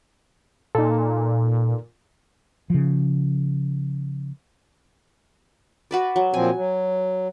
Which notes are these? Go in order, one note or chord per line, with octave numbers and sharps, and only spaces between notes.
A#2 D#4 A4
C#3 F3
F#4 B4 D5
F#3
A#2 F3 C4 G#5
F#3